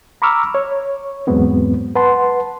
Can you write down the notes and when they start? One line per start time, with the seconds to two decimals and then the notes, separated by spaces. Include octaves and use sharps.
0.22 A#5 B5 C#6 D6 E6 F6
0.55 C#5
1.27 E2 G#2 F#3 G#3 B3 C4
1.96 B4 F#5 A5 C6